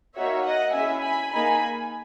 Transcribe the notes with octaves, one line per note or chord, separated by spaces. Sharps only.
A#3 D#4 F#4 C#5 E5
D#5 F#5
C#4 E4 G#4 E5 G#5
G#5 B5
A#3 D#4 G#4 G#5 B5